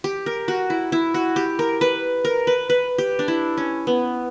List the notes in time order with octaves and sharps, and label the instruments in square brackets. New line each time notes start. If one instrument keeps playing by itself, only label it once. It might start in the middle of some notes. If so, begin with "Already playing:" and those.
[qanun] G4
A#4
F#4
E4
E4
F#4
G4
A#4
B4
A#4
B4
B4
G4
D4
E4
C#4
B3